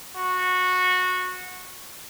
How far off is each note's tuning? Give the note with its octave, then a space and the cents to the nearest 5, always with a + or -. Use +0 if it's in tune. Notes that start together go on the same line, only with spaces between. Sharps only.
F#4 -15